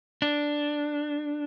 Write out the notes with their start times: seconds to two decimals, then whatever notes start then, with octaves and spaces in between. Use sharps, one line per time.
0.22 D4